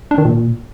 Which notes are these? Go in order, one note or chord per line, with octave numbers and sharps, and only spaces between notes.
D4
D#3
A#2